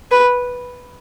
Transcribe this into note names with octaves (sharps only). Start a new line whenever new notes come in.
B4